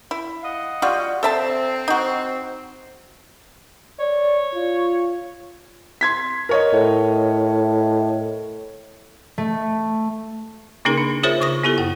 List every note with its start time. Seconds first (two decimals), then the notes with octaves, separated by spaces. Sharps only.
0.11 E4
0.43 D#5 F5 F#5
0.82 G3 F4 F#4
1.23 C4 A4 E5 A5
1.88 D#4 F#4
4.00 C#5 D5
4.55 F4
6.01 C6 G#6 B6
6.49 A#4 C#5 D#5
6.73 A2
9.38 A3
10.85 C#3 A#3 C#4 D#4 G#4 A#4
10.98 D4
11.23 F4 G#4 A#4 C5 C#5 E5
11.41 C#3 C#6 D#6 A#6
11.63 B3 E4 G4 A4
11.78 F#2 F#5